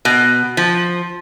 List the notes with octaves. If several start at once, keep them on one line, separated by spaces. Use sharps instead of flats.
B2
F3